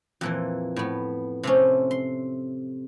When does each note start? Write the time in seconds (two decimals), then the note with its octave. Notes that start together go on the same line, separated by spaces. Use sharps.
0.21 F2 A#2 E3
0.76 A2 B3
1.43 C3 A3 C#4
1.91 C6